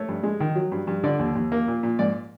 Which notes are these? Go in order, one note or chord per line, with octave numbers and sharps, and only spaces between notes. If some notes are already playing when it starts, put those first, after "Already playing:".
Already playing: A3 C#5
G2
G#3
D#3
F#3
G2
G2
D3 D5
D#2
D#2
A#3
A#2
A#2
G#2 D5